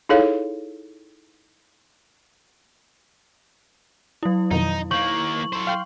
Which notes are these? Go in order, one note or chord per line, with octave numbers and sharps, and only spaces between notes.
D#4 E4 G#4 A4 C#5 F5
F#3 E4
F2 B2 D#3 D#4
D#2 A#3 C#6 G6 F#7
A4 C5
F5 G5 C6